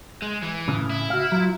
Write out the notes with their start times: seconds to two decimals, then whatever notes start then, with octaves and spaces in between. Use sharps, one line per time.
0.22 G#3
0.42 E3
0.68 A2 C#3
0.90 E4
1.10 F#4 F5
1.32 F#3 F4